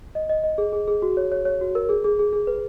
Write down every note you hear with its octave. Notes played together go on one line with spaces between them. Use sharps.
D#5
D#5
D#5
G#4
G#4
G#4
F#4
C#5
C#5
C#5
F#4
A#4
G#4
G#4
G#4
G#4
B4